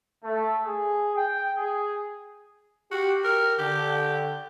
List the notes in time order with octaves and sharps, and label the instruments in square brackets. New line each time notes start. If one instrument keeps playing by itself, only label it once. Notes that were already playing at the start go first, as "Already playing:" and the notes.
[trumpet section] A3
G#4
G5
G#4
[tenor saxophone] F#4 [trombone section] G4
[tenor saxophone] A#4
[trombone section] D3 [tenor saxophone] G4